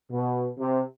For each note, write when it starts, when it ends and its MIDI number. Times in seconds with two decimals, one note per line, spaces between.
0.11 0.49 47
0.58 0.81 48